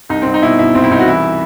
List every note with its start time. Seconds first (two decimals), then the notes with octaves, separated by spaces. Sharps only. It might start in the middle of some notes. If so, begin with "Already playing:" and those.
0.09 C2 D#4
0.22 C2 C4
0.34 D#4
0.42 B2 E4
0.47 D#4
0.59 B2 E4
0.75 C2 C4
0.84 E4
0.91 C2 D#4
0.99 F#4
1.07 E3 E4